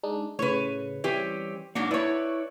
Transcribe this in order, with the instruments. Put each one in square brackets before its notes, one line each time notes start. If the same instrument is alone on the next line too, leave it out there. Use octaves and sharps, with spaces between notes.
[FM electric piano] G#3 D4 D#4
[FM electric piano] A2 C#3 [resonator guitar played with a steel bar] B4 C#5
[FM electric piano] E3 G3 [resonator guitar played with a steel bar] C4 C#4 G4
[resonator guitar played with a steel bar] G#2 F#3 D4 [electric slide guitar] A#3 [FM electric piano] C#6
[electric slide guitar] E4 D5 [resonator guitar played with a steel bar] B4 C#5